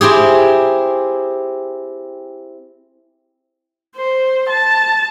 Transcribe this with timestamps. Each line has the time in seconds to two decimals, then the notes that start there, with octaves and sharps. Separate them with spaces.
0.01 C4 E4 G4 G#4
3.96 C5
4.50 A5